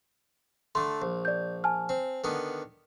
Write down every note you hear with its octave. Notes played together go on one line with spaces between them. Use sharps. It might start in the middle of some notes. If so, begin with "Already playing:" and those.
D3 A3 C6
A#1
D5 G6
G#5 A5 F6
C4
D3 D#3 B3